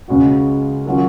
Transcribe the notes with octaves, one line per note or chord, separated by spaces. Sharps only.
C#2 C#3 G#3 C#4 F#4
D#3 F#3 C#4 F4